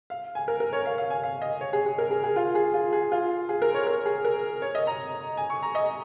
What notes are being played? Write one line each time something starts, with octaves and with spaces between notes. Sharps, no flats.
F5
G#5
A#4
A#4
C#5
F5
F5
G#5
F5
D#5
C#5
G#4
G#4
A#4
G#4
G#4
F4
G#4
F4
G#4
F4
G#4
A#4
C#5
A#4
G#4
A#4
C#5
D#5
A#5
G#5
C#6
A#5
D#5